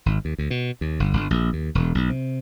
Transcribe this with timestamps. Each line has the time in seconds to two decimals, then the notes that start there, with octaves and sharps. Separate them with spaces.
0.06 G#1
0.25 D#2
0.38 D2
0.50 B2
0.81 D#2
1.00 G1
1.13 G1
1.30 A#1
1.53 D#2
1.75 E1
1.95 B1
2.10 C3